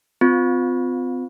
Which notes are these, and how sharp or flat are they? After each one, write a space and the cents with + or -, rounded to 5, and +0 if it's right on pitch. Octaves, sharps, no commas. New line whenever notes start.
C4 -40 F4 +15